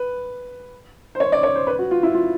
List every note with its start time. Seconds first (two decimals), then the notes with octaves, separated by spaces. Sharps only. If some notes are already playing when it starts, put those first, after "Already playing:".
Already playing: B4
1.15 C5
1.20 C#5
1.32 D5
1.43 C#5
1.55 C5
1.67 B4
1.79 F#4
1.91 F4
2.03 E4
2.14 F4